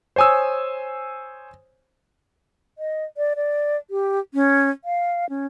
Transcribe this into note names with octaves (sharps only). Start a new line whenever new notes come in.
C5 C#5 G#5 D#6 E6
D#5
D5
D5
G4
C#4
F5
C#4